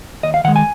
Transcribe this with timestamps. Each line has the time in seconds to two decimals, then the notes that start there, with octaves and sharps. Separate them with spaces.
0.23 D#2 D#5
0.34 F5
0.44 D#3 G#3 F#5
0.56 G#5